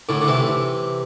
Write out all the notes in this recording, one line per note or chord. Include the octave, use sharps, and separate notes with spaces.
A2 D3
D3
C3 E3